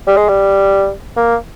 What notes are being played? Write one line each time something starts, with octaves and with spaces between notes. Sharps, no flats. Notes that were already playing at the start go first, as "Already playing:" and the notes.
G3
G#3
G3
A#3